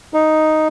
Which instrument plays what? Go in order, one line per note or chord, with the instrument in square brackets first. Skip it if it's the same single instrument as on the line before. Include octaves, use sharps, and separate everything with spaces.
[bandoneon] D#4